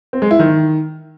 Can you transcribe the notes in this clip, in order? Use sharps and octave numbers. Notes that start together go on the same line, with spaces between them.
C4
G#3
E4
D#3